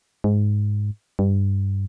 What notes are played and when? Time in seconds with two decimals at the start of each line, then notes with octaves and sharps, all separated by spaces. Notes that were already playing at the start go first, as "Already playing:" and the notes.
0.24 G#2
1.19 G2